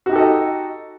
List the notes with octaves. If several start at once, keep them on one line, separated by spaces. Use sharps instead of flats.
D#4 F#4 G4 A4 D#5